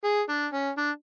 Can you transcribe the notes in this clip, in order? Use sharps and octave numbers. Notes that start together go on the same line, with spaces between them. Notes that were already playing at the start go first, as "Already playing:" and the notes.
G#4
D4
C#4
D4